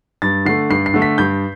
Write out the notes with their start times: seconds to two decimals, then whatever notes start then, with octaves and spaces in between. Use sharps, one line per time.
0.22 G2 A6
0.45 D3 A3 C7
0.70 G2 C7
0.86 C7
0.94 D3 A3
1.02 B6
1.18 G2 G6